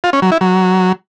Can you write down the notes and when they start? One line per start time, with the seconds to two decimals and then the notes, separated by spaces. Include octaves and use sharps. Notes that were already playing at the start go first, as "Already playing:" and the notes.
0.04 F4
0.13 C#4
0.22 F#3
0.32 E4
0.41 F#3